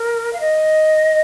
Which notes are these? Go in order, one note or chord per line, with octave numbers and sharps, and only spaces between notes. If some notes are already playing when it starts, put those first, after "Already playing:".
Already playing: A#4
F5
D#5